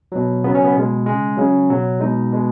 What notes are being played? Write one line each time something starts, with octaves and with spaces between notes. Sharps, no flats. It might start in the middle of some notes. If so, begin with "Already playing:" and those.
B2 F#3
C#3 F#3 B3
C#4
B3
B2 G#3
C#3 G#3
C#3 F#3 C#4
B2 F#3
B2 G#3 D#4
B2 G#3